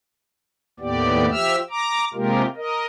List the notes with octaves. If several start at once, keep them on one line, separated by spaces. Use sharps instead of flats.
D#2 A2 B3 G4 D5
F3 G4 E5 E6 F6
A#5 D6
C3 G#3 A#3 F4 G4 A#4
A#4 D#5